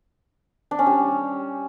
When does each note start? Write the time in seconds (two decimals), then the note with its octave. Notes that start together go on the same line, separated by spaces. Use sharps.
0.71 D4
0.79 C#4
0.86 G3